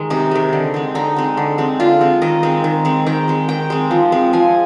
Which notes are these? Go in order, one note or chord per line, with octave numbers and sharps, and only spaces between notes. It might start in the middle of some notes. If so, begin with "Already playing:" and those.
Already playing: D#3 G#3
C3 D#4
D#3 G#3
D3
G#3 C4
D3 D#4
G#3 C4
D3
G#3 C4
D3 F4
G#3 C4
D#3 D#5
G#3 C4
D#3
G#3 C4
D#3 G5
G#3 C4
D#3 G5
G#3 C4
F3
G#3 C4
F3 G#5